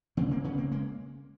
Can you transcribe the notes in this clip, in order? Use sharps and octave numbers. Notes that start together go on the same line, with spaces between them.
C#3 A#3 C4
A#3 C4
C#3 B3 C#4
A#3 C4
G#3 A#3